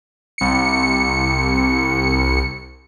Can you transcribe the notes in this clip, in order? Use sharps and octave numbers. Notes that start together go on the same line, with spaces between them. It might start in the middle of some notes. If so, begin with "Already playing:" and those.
C2 C#7